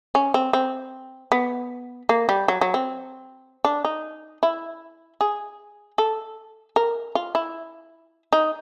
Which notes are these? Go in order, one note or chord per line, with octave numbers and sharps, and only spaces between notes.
C#4
C4
C4
B3
A#3
G3
F#3
F#3
C4
D4
D#4
E4
G#4
A4
A#4
F4
E4
D#4